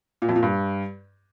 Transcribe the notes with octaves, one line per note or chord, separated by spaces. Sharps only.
A#2
F2
A#2
G2